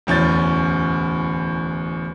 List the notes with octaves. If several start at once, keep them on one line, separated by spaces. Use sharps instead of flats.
D1 E2 C#4 G6 A6